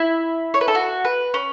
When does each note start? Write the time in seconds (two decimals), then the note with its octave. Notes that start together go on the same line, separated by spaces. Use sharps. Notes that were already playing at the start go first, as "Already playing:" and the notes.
Already playing: E4
0.54 C#5
0.61 B4
0.68 A4
0.75 F#4
1.05 B4
1.34 C#4